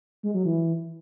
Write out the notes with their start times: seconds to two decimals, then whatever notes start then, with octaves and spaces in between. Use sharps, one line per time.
0.23 G#3
0.34 F#3
0.45 E3